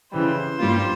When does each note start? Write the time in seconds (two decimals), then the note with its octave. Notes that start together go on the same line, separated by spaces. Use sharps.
0.12 C#3 E3 G3 C5
0.59 G2 G3 A#3 F4